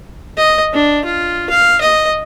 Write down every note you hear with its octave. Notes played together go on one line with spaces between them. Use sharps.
D#5
D4
F4
F5
D#5